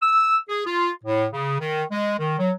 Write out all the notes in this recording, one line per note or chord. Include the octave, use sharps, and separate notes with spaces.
E6
G#4
F4
A2
C#3
D#3
G#3
D#3
F#3